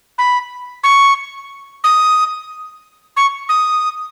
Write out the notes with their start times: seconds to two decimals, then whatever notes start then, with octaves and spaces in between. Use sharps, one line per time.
0.18 B5
0.84 C#6
1.84 D#6
3.17 C#6
3.49 D#6